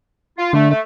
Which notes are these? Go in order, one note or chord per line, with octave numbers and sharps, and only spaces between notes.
F4
D3 A3
A3